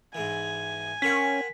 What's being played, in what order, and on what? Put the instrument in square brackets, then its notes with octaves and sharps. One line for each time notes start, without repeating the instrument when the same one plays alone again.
[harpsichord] G#2 E3 [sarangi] G#5
[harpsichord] C4 A#4 F#5 [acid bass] C#4 [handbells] B6